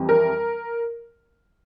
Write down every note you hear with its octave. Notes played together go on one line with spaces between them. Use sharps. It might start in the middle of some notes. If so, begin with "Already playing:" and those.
Already playing: F2 E3 G3
A#4